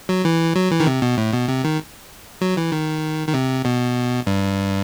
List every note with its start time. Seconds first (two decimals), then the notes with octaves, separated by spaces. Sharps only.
0.09 F#3
0.25 E3
0.56 F#3
0.71 E3
0.80 D#3
0.87 C3
1.02 B2
1.18 A2
1.33 B2
1.49 C3
1.64 D#3
2.41 F#3
2.57 E3
2.72 D#3
3.28 D#3
3.34 C3
3.65 B2
4.27 G2